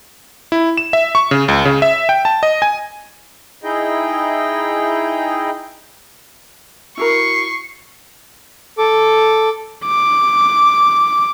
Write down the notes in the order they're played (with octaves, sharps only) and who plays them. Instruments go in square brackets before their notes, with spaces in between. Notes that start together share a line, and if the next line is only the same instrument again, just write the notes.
[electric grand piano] E4
E7
E5
C#6
C#3
C#2
C#3
E5
G5
A5
D#5
G#5
[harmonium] D#4 E4 G#4 D#5 G5
[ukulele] E4 F#4 A#4 [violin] C#6 C7
[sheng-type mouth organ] A4 D6
[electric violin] D6